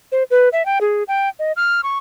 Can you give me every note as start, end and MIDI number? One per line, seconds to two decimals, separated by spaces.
0.12 0.23 72
0.31 0.49 71
0.53 0.65 76
0.66 0.79 79
0.81 1.03 68
1.08 1.29 79
1.39 1.52 75
1.56 1.81 89
1.83 1.98 85